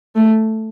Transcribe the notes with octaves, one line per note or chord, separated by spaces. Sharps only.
A3